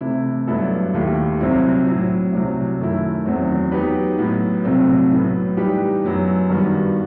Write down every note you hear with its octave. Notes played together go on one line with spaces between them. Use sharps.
C3 E3 A3 E4
G2 F#3 B3 E4 A4
D#2 D#3 A3 E4 G4
C2 C3 F#3 C4 E4
A2 F#3 C4 E4
C2 C3 F#3
F#2 D#3 A3 E4
E2 D#3 F#3 C4
F#3 B3 D#4 G4 B4
A2 F#3 B3
C2 C3 F#3 A3 C4
A2 F#3 B3
E3 G3 D#4 G4 B4
F#2 F#3 B3
G2 D#3 G3 B3 F#4